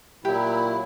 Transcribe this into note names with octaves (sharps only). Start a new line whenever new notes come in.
A#2 F#3 E4 G4